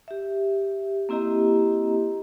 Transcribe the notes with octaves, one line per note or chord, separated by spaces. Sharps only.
G4 E5
A#3 C4 E4 G4 D#5 A#5